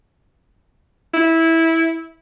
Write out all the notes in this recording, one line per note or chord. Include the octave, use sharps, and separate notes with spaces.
E4